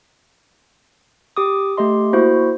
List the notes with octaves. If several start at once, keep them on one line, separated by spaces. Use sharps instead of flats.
G4 D6 D#6
A3 G4 D#5 C6
A#3 E4 F#4 C5